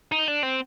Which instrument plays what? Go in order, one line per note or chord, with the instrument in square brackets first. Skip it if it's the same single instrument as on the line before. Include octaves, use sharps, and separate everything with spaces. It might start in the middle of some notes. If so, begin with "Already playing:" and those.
[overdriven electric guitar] D#4
D4
C4